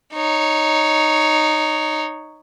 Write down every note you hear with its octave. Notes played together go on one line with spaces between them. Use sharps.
D#4 C#5